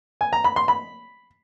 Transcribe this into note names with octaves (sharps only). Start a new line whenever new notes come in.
G#5
A#5
B5
C6
B5